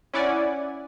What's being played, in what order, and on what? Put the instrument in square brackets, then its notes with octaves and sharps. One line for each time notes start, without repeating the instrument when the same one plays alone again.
[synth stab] C#4 E4 D5 F#5 G#5